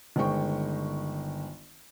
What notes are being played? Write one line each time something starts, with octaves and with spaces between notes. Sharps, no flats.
G1 D#3 G#3 C5 G5 C#6